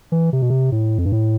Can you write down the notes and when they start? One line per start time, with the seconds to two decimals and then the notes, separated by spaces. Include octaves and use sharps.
0.12 E3
0.33 C3
0.42 B2
0.50 C3
0.72 A2
0.98 F2
1.05 G2
1.12 A2